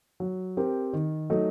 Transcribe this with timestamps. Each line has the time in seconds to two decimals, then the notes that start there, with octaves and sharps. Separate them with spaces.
0.20 F#3
0.57 C4 G4 A#4
0.93 D#3
1.30 F#3 A3 D#4